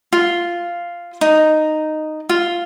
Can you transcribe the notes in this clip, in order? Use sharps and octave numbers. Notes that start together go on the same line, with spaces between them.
F4
D#4
F4